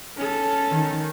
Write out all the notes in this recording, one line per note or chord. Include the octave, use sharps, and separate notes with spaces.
C#4 A4
D#3